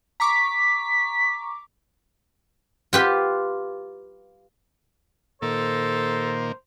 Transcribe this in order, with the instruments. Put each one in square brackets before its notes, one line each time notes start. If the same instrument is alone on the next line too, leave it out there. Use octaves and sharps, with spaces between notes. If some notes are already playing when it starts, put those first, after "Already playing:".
[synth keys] A#5 C#6 D6 [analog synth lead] B6
[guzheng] F4 G4 B4
[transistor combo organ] A#2 D#3 A#3 [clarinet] A4 [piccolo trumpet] C5